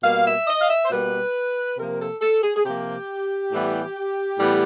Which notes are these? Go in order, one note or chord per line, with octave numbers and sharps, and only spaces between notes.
B2 G3 A#3 F5
E5
D#5
F5
E5
C5
B2 G3 A#3 B4
C3 F3 A#3 A#4
A4
A4
G#4
G#4
C3 F3 A#3 G4
A2 E3 G3 B3
A2 E3 G3 B3